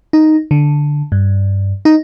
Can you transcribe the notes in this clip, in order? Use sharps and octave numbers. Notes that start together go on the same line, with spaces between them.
D#4
D3
G2
D#4